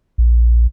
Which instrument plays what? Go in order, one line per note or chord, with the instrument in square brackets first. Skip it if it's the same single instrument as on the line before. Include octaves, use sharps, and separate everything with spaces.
[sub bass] A#1